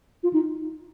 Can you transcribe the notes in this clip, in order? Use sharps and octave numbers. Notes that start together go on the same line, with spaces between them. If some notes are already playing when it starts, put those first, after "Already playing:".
F4
D#4